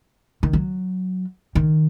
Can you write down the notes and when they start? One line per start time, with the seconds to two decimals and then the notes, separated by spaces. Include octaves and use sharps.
0.43 D#3
0.53 F#3
1.55 D#3